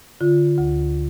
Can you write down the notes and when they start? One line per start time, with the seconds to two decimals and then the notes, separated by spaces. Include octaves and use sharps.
0.21 D3 F4
0.58 D2